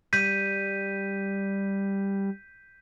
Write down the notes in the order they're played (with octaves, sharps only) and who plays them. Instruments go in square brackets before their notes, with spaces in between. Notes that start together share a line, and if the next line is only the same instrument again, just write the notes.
[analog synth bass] G3 [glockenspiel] G6 B6 D#7